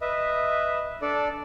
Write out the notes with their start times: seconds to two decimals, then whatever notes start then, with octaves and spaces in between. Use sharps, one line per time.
0.01 B4 D#5 E5
1.02 D4 A4 D5